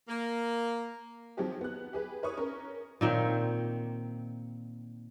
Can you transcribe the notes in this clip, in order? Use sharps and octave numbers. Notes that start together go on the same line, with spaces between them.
A#3
D#3 F3 F#3 C4 G4 G#4
B3 F#6
G4 G#4 B4
A#4 B4 C#5 C#6 D#6
C#4 A#4
A#2 D#3 C4 C#5